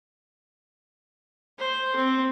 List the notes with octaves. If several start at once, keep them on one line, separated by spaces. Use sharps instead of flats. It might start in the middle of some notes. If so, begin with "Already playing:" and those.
C5
C4